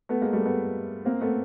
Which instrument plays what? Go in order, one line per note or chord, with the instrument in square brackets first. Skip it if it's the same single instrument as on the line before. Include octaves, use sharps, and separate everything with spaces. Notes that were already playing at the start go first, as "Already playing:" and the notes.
[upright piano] A3 B3
G#3 A#3
G3 A3
A3 B3
A#3 C4
A3 B3